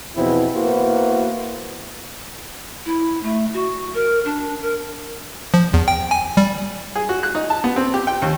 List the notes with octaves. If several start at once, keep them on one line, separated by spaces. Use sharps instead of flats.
E2 B2 F3 B3 C4 E4
A#3 B3 E4 F#4 B4 C5
E4
A3
F#4
A#4
D4
A#4
F3
E2
G5
G#5
G3
G#4
F#4
F#6
D#4
A5
B3
C4
G4
G5
D#2